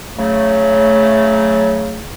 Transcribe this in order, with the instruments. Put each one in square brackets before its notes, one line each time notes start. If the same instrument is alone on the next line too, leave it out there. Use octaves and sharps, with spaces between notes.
[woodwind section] C#3 F#3 A3